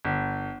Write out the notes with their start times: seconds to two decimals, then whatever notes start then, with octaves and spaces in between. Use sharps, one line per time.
0.05 G1